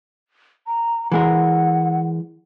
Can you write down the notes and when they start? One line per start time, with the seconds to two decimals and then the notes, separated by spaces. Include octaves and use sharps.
0.67 A#5
1.12 E3 G#3 A#4 F#5